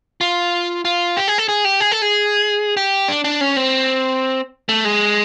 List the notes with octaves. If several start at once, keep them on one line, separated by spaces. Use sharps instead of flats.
F4
F4
G4
G#4
A4
G#4
G4
G#4
A4
G#4
G4
D4
D4
C#4
C4
A3
G#3